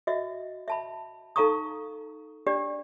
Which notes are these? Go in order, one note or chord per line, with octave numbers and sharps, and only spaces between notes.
F#4 D#5 E5
E5 A5 B5
D#4 A4 F5 A#5 C#6 D#6
D4 G4 D5